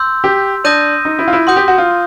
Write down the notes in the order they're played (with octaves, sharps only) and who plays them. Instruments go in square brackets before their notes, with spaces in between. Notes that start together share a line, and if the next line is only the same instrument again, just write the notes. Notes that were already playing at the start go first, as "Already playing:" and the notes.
Already playing: [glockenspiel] C6 E6 G6
[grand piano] G4
[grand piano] D4 [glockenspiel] D#6 G6 A#6 D#7
[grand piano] D#4
E4
F4
E4
[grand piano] F#4 [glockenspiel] C6 D#6 G6
[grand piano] G4
F#4
F4